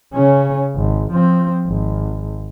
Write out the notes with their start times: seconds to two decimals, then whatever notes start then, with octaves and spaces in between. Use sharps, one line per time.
0.14 C#3 C#4
0.76 G#1
1.12 F3 C4
1.67 G#1